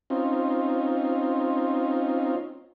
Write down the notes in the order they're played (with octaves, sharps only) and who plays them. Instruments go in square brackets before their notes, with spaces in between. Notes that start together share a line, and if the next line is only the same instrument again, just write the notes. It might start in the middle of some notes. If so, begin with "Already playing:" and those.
[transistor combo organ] C4 C#4 D#4 F4